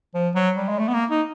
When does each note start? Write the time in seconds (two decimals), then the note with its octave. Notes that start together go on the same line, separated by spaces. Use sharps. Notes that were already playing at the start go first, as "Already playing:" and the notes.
0.14 F3
0.35 F#3
0.57 G3
0.69 G#3
0.79 A3
0.88 B3
0.94 A#3
1.10 D#4